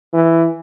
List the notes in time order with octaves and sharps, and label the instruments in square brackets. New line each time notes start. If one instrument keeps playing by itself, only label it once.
[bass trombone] E3